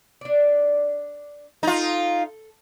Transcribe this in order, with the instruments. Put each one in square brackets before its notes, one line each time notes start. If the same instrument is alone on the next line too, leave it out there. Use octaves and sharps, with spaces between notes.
[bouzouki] D4 D5
[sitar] D#4 F4 [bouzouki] A4